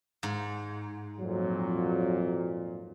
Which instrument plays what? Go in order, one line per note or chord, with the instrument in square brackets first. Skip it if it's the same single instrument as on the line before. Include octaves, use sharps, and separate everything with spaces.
[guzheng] G#2
[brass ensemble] F2 A#2 [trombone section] F#3